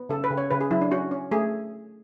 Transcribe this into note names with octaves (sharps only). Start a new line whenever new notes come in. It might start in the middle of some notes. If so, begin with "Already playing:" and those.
Already playing: B3
C#3 A4
B4
C#3
C#5
C#3 B4
G#4
F#3 E4
D4
C#4 F#4
C#4
A3 G#4